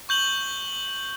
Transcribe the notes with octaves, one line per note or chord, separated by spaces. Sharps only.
C#6 G6 F#7 G7